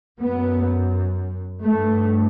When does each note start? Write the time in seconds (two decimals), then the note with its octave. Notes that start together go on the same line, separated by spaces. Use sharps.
0.20 F#2 B3
1.64 G2 A3